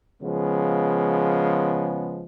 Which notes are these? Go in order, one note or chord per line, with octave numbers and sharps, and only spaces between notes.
C#3 F3 G#3 B3